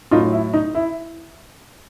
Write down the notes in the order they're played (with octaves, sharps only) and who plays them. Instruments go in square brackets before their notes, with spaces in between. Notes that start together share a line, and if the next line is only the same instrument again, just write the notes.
[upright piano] A2 F#3 D#4 F4
E4
D#4
E4